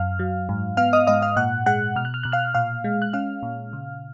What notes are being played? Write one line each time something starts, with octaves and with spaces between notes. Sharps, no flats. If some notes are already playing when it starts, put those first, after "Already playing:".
Already playing: F#2 F5 F6
F#3
G#2
B3 F5 F6
D#5 D#6
G#2 D#5 D#6
F5 F6
A#2 F#5 F#6
G#3 F#5 F#6
B2 F6
F#6
F6
B2 F#6
F5 F6
A#2 F5 F6
G#3
F#6
C#4 F5 F6
A#2
C#3